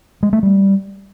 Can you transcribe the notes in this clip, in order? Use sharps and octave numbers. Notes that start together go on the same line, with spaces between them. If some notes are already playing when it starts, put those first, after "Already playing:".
G#3
A3
G3